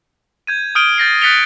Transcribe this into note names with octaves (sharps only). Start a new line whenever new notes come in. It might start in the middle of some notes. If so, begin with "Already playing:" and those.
G6 G#6 D#7
D#6 F6 G6 D7 D#7 G7
G6 A6 A#6 C7
F#6 A6 B6 C#7 F7 G7